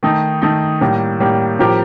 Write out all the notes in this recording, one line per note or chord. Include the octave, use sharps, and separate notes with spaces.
D#3 A3 D#4
D#3 A3 D#4
A2 G3 A#3
A2 G3 A#3
A2 F3 C4 G4 A#4